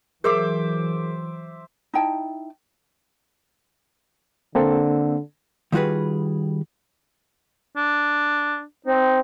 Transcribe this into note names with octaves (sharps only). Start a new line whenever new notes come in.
E3 F#3 G#4 A#4 C5 E5 D6
D#4 E4 G5 A5
D3 A#3 C4 A4
D#3 G3 F4 F#4 G#4 B4
D4
C4 D#4